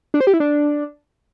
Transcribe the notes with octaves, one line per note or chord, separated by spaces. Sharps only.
D4
C5
G4
E4
D4